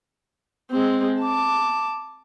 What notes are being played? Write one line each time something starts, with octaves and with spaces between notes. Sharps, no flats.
G#3 C4
A5 D6